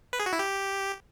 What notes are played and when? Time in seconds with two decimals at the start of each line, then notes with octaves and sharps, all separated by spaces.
0.13 B4
0.20 G#4
0.26 F#4
0.33 E4
0.39 G4